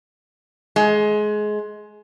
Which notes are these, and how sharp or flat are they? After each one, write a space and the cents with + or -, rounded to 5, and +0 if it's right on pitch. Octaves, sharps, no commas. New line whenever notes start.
G#3 +20